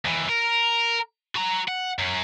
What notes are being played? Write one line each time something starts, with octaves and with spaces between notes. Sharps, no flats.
D#2 E3
A#4
F#4 A#5
F#5
F#2 F#3